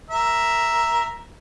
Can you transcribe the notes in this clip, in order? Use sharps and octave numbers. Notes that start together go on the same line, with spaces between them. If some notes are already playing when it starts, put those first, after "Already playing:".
A#4 E5